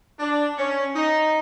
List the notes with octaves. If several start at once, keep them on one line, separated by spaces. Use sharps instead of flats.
D4
C#4
D#4